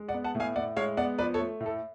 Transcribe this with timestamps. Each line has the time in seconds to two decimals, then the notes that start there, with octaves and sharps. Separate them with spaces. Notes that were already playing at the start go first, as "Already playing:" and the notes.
Already playing: G#3
0.08 D5 F#5
0.14 B3
0.24 F#5 A5
0.35 A2
0.40 F5 G#5
0.56 A2 D5 F#5
0.77 G#3 C#5 F5
0.97 B3 D5 F#5
1.18 F3 B4 D5
1.34 A4 C#5
1.40 A3
1.60 A2
1.66 A4